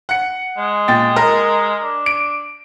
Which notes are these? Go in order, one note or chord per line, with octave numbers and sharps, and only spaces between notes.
F#5 C#7
G#3
A#2 G5 A6
A#4 D#5
D4
D7